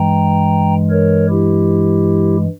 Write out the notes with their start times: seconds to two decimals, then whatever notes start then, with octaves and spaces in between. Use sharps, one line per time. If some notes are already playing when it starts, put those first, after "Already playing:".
Already playing: G2 E3 G#3 G5 A#5
0.91 A#4 C#5
1.29 E4 G4